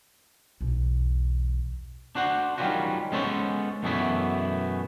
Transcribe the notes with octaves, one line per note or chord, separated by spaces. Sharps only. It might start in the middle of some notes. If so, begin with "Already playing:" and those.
B1 E2
D4 F#4 C5 F#5
D#3 F#3 G3 C#4 F4 F#4
G#3 B3 C#4 A4 C5 C#5
F#2 B2 E3 A3 B3 E4